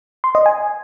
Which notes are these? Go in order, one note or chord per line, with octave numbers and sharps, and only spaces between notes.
C6
D#5
G#5